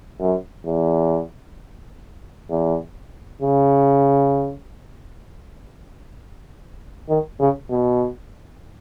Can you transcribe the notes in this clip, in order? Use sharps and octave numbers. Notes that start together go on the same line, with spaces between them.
F#2
E2
E2
C#3
D#3
C#3
B2